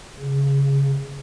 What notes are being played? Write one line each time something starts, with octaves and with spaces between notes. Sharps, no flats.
C#3